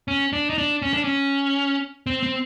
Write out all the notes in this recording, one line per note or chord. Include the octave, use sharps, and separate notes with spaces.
C#4
D4
D#4
D4
C#4
D4
C#4
C4
C4